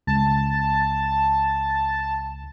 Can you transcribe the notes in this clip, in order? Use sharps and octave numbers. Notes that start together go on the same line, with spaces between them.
C#2 A5